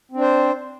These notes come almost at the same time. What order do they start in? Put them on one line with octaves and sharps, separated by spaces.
C4 D4 C5